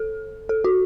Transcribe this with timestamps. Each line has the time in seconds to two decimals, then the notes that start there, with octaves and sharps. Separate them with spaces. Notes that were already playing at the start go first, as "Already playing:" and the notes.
Already playing: A4
0.49 A4
0.64 F#4